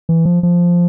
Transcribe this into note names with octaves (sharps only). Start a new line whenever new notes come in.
E3
F3
F3